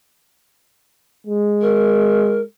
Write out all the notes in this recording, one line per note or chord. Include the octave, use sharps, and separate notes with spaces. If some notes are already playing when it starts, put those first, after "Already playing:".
G#3
A#4